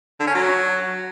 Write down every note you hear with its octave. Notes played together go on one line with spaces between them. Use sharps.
D3
C#4
F#3